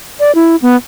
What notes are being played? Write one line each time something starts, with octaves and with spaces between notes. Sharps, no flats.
D5
E4
B3